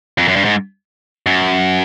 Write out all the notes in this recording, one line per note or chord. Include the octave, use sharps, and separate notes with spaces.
F2
F#2
G2
G#2
F#2